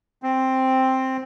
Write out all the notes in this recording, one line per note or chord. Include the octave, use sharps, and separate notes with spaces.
C4